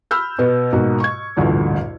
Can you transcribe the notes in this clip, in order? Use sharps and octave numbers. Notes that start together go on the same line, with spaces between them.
B5 E6 F6 G6
B2 B3
G#2 B2 A#3 F#4
C#6 G#6
A1 D2 G2 A#2